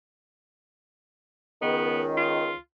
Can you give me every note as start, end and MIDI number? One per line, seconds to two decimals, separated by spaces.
1.62 2.51 37
1.62 2.51 51
1.62 2.01 59
2.17 2.56 65